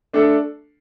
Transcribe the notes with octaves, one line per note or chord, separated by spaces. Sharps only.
A3 D4 A4